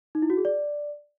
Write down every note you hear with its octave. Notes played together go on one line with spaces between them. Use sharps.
D#4
E4
F#4
G#4
D5